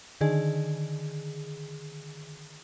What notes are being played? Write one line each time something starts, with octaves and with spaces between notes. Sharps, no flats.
D3 D#3 G#4